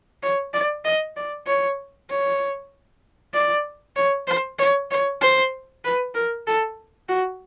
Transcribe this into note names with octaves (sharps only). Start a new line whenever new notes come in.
C#5
D5
D#5
D5
C#5
C#5
D5
C#5
C5
C#5
C#5
C5
B4
A#4
A4
F#4